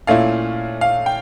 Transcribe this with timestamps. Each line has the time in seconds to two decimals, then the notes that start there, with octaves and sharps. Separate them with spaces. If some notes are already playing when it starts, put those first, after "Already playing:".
0.07 A#2 A3 C#4 E4 F5
0.81 F5
1.06 G5